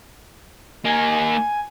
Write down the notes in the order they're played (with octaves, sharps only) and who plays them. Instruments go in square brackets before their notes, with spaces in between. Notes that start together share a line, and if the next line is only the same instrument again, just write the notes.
[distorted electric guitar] A#3 D#4 [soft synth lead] G#5